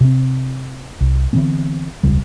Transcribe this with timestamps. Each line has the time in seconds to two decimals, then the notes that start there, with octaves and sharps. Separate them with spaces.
0.01 C3 C4
1.01 C2
1.33 D3 E3 B3 C4
2.03 E1 C#2 C#3 G3